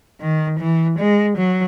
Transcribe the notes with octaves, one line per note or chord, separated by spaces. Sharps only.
D#3
E3
G#3
F#3